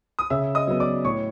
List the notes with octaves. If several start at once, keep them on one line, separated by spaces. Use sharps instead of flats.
D#6
C#3 E5 E6
D#5 D#6
F#3 B3
D5 D6
A2 C#5 C#6